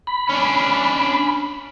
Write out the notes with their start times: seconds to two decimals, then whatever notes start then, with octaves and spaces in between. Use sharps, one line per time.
0.07 B5
0.29 C#4 D4